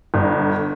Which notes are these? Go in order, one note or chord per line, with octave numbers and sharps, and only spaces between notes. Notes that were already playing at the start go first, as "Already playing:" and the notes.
G1